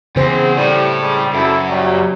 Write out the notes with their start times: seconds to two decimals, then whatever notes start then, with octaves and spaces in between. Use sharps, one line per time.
0.16 E2 C#3 C4 G#4 C5
0.57 A2 G3
1.00 G3 G#3
1.34 F#2 E4 A4
1.68 A#2 F#3 G3